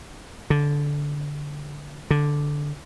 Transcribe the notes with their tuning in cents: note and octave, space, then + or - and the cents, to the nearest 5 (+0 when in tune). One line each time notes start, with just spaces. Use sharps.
D3 -15
D3 -5